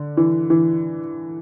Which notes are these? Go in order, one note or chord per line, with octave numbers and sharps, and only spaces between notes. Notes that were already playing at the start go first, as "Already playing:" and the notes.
Already playing: D3
E3
E3